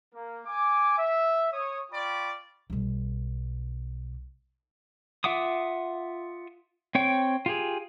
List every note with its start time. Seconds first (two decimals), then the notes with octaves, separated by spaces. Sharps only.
0.14 A#3
0.46 G#5 D6
0.98 E5
1.51 C#5 D#6
1.92 F4 D5 G5 B5 C#6
2.70 B1 G3
5.24 F4 E5 F#5 D6 D#6
6.95 C4 C#5 G5
7.46 F4 G4 G#4